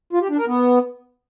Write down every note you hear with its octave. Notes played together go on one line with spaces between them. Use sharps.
F4
G4
D4
A#4
B3